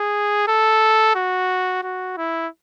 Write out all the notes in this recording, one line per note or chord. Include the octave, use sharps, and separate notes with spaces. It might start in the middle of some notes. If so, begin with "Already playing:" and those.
Already playing: G#4
A4
F#4
F#4
E4